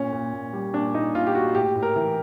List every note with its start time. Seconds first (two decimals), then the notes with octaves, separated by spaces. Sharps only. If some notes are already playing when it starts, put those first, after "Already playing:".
Already playing: A#2 C#4
0.13 A#2
0.33 A#2
0.53 G3
0.73 A#2 D4
0.94 A#2 D#4
1.14 A#2 F4
1.27 G4
1.35 A#2 F#4
1.55 A2 G4
1.75 A2
1.83 A#4
1.96 E3